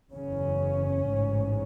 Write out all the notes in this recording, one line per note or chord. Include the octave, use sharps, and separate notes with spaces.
F#1 E2 C#3 C#4
A1 G#2